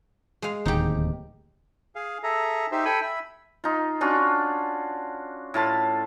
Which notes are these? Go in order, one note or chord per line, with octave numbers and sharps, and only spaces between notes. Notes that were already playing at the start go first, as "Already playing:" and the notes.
G#3 F5
D1 D#2 D#4 G4
G#4 F5
G#4 A4 E5 A#5
D#4 G4 C5 E5
A4 G5 G#5 B5
E5 B5
D#4 F4
C#4 D4 F4 F#4
A2 F4 A5 B5